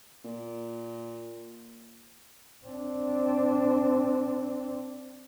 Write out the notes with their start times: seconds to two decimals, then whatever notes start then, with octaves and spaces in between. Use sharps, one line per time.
0.24 A#2
2.66 C4 D4